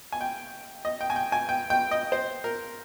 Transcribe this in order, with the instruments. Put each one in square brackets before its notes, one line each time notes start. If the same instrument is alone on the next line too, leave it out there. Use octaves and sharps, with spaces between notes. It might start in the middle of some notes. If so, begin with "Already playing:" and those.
[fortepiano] G#5
G5
D#5
G5
G#5
G5
G#5
G5
G5
D#5
C5
A#4